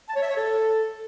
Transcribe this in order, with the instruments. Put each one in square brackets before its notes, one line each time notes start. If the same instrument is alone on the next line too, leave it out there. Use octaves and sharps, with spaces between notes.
[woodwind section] A5
C#5
E5
C#5
A4